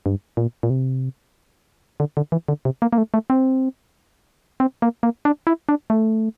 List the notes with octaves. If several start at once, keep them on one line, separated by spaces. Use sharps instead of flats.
G2
A#2
A#2
C3
D3
D3
E3
D3
C3
A#3
A#3
A3
A3
C4
C4
A#3
A#3
D4
E4
D4
A3